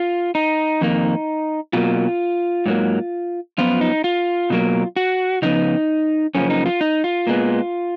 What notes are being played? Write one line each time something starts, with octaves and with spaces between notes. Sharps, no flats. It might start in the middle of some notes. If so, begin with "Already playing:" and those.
Already playing: F4
D#4
F2 D#3 A#3
B2 F#3 A#3 F4
G#2 F#3 A#3
F#2 F3 B3 F4
D#4
F4
B2 F#3 A#3
F#4
C#3 F3 B3 D#4
F#2 C#3 F3 A#3 C#4
D#4
F4
D#4
F4
A#2 G#3 B3